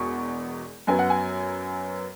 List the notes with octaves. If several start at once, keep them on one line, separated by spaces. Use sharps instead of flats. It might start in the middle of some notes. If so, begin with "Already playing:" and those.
Already playing: E1 E2 B2 C#6
F#2 F#3 B3 G#5
F#5
G#5